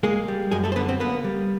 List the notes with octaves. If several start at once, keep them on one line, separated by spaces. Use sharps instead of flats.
G#3 A#3 G#4
G3
F#2 G#3 G#4
A3 A4
C5
D3 B3 B4
C4 C5
A#3 B3 B4
G3